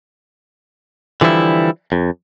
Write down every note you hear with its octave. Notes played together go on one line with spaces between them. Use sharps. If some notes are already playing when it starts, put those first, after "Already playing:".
D3 E3 F3 G3 E4
F2